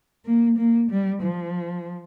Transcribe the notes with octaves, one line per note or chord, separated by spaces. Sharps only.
A#3
A#3
G3
F3